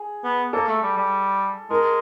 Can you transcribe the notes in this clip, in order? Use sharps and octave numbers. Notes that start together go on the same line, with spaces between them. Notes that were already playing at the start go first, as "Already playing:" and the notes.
Already playing: G#4
B3
A#3 A4
A3
G3
G3
G#3 A#4